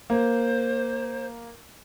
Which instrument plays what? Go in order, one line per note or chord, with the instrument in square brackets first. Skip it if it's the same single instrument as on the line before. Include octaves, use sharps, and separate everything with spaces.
[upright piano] A#3 [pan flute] C5